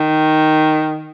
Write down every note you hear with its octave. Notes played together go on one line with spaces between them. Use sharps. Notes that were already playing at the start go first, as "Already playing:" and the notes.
Already playing: D#3